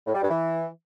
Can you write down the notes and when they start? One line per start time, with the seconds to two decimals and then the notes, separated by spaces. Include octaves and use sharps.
0.06 A2
0.14 G3
0.22 G2
0.30 E3